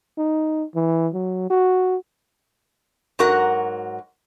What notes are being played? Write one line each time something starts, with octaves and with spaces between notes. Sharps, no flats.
D#4
E3
F#3
F#4
G#2 F#3 F#4 A#4 F#5